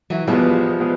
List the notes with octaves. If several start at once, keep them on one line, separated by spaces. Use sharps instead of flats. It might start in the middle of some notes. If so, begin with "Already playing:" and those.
E3 F#3
E2 B2 F3 G3 G#3 B3
B2 G#3 B3